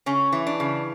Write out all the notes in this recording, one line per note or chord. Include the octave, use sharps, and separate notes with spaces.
C#3 C#4
E3
D4
C#3